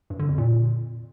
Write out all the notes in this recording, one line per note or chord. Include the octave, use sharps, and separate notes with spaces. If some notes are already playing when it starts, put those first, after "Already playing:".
G2
D3
F2
A#2